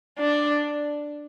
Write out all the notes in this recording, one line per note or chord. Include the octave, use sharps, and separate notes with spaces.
D4